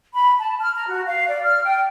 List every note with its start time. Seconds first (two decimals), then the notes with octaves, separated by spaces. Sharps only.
0.14 B5
0.39 A5
0.60 F6
0.75 A#5
0.89 F#4
1.06 F5
1.27 D5
1.43 F6
1.64 G5